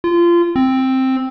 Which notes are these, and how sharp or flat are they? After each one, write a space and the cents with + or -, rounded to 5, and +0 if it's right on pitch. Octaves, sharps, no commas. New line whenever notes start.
F4 -25
C4 +5